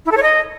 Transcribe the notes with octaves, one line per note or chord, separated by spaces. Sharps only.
E4
A4
C#5
D#5